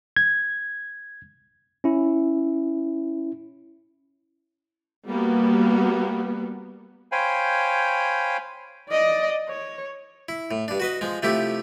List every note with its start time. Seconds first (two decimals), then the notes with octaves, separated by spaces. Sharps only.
0.16 G#6
1.84 C#4 E4
5.07 G3 A#3 B3 F#4
7.12 C5 C#5 F5 G5 G#5 B5
8.89 D5 D#5
9.49 C#5
10.29 E4
10.51 A2
10.68 G2 D4
10.80 F#4 B4 D#5
11.01 F3 G#3
11.23 C3 F3 A3 E4 G4